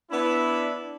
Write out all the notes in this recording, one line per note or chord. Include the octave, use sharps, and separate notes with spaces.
B3 D4 E4